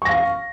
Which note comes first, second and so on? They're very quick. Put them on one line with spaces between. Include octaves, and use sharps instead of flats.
C#6 A#6 F5